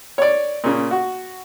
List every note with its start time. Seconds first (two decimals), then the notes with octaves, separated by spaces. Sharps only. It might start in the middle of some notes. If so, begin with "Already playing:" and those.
0.18 C#5 D5
0.64 A#2 C#3
0.91 F#4